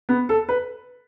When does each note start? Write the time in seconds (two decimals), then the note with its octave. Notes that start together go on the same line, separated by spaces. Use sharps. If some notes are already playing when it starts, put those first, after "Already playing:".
0.09 B3
0.29 A4
0.49 B4